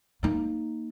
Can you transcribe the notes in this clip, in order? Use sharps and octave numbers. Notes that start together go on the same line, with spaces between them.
A#3 D#4